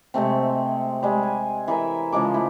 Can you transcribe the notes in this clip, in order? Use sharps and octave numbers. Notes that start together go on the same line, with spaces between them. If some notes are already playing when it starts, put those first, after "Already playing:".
C3 G#3 A3 C4
G3 G#3
G#5
E3 G#4 A#4 E5
C#3 F3 G#3 D6
A3 E4